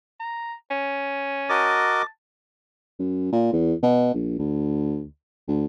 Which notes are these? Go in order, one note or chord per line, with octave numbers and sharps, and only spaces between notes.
A#5
C#4
F#4 A#4 D#5 A5 D6
F#2
A#2
E2
B2
A#1
D2
D2